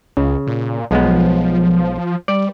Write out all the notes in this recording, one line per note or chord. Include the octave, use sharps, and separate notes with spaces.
C#2 C#3
A#2
B1 F3 G#3 B3
G3 D5